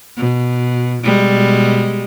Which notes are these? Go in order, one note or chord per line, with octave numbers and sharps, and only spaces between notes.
B2
B2 G3 G#3